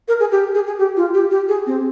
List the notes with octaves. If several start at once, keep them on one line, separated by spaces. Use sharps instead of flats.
A#4
G#4
G4
G#4
G#4
G4
F4
G4
G4
G#4
C4